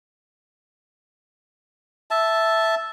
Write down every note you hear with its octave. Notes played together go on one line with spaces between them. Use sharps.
E5 A5